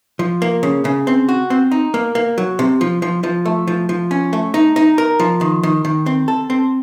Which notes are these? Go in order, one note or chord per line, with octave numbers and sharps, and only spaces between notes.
F3
A#3
C#3
C#3
C4
F#4
C4
D#4
A#3
A#3
F#3
C3
F3
F3
F3
A3
F3
F3
C#4
A3
D#4
D#4
A#4
F3
D#3
D#3
D#3
C4
A4
C4